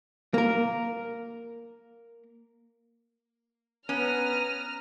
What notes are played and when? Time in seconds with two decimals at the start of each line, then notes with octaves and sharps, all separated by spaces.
0.34 A#3 A#4
3.89 B3 C#4 A#5 F6 D#7